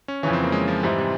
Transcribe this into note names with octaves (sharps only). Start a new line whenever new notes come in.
C#4
F2 C#3 E3 C#4
C4
A#3
G#3
F3
G#2 E3 G3 C4 E4
C3